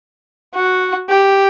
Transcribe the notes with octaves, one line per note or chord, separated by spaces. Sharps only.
F#4
G4